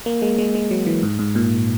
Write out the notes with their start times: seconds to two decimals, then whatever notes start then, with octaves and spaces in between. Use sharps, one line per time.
0.06 A#3
0.22 G#3
0.38 G#3
0.55 G#3
0.71 F#3
0.86 E3
1.03 G#2
1.19 G#2
1.35 A#2